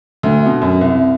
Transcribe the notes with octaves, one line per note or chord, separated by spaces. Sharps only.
D2
B2
F#2
C2